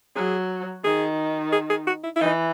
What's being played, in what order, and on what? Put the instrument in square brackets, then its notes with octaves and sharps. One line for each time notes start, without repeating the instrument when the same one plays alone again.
[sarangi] F#3 [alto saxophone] G#4
[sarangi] D#3 [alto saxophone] G#4
[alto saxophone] G#4
G#4
F#4
E4
E4
[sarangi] E3 [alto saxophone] D#4